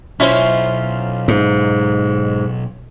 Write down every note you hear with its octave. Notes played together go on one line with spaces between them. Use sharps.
B1 C#4 E4 F4 C5 C#5 E5
G#2